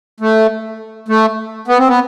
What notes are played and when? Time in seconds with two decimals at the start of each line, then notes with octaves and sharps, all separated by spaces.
0.20 A3
1.08 A3
1.68 B3
1.78 C4
1.88 B3